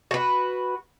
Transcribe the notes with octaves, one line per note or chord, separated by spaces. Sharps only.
F#4 B4